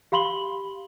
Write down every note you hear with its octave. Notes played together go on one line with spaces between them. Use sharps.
G4 F5 B5 C6 F#7 G7